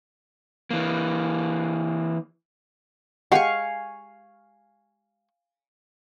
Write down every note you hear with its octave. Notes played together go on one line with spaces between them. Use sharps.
E3 A#3
G#3 G4 F5 F#5 G#5 C#6